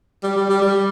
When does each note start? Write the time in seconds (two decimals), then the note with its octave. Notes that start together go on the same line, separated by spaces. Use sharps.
0.23 G3
0.36 G3
0.49 G3
0.62 G3